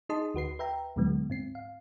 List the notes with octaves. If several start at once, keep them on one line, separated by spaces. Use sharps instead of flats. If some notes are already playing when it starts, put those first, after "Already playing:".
D#4 G#4 D#5 A5 C6 D#6
D2 F#4 B4 C7
B4 E5 G5 A#5
D2 A#2 D3 F#3 G#3 B3
G#2 C4 C7
F5